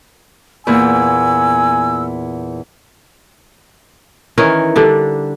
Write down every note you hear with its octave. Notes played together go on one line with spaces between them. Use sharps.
E2 A#2 G#5 E6
D#3 E3 C#4 A#4
D3 G3 D4